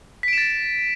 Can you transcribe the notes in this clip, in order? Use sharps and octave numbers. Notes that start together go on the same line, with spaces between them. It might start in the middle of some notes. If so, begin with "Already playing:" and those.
A6 B6 D7 E7